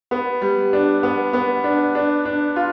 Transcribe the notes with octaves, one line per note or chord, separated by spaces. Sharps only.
B3
G3
D4
B3
B3
D4
D4
D4
F4